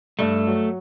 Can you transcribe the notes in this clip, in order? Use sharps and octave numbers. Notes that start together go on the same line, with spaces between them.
G2 A3
F#3